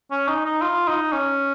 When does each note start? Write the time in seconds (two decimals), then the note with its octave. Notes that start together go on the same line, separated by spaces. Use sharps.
0.11 C#4
0.28 D#4
0.45 D#4
0.61 F4
0.88 D#4
1.13 C#4